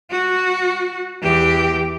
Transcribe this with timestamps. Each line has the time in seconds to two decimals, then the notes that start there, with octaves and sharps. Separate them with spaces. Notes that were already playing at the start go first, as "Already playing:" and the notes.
0.11 F#4
1.22 E2 G4